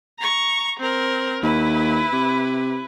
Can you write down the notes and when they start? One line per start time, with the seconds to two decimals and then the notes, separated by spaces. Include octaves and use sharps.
0.19 A#5 C#6
0.80 C4 A#4
1.42 D#2 E4 B4
2.13 C3